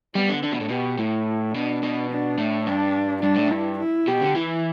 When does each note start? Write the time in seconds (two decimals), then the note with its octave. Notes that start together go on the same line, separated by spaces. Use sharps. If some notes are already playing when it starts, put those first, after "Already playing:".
0.15 G3 B3
0.29 D3
0.43 D3 D4
0.52 B2
0.60 A2
0.69 B2 G4
0.98 A2 E4
1.54 B2 D4
1.83 B2
2.11 D4
2.38 A2
2.67 G2 D4
3.23 G2 D4
3.36 A2
3.48 G2 E4
3.79 E4
4.07 B2 G4
4.21 D3
4.35 E3 E4